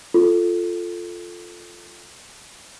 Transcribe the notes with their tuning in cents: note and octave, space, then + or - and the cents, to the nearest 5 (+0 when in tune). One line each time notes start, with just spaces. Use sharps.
F4 +0 A4 +0